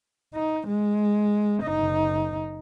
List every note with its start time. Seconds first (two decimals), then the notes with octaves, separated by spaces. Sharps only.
0.34 D#4
0.68 G#3
1.63 F#1 D#4